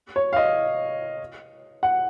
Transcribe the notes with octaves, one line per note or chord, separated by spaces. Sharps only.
C#5
F5
D#5
F#5